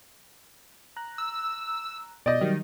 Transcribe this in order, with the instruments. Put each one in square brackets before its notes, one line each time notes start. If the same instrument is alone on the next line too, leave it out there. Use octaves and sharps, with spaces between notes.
[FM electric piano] A#5 F#6
[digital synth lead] E6
[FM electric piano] B2 G6 [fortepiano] D5 D#5
[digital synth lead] D#3 [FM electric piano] F#3 G3